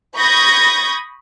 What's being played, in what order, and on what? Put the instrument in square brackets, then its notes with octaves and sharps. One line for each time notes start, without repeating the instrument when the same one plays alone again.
[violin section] B5 C#6 D#6 G6 G#6 A#6